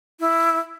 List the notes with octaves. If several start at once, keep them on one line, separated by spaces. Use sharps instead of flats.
E4